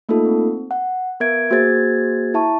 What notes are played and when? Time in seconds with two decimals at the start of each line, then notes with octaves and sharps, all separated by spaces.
0.09 A3 A#3 D#4 F4 A4
0.25 C4
0.71 F#5
1.20 B3 A#4 E5 G#6 D7
1.50 A#3 F#4 G#4 C5 G#6 A6
2.34 E4 E5 A5 C#6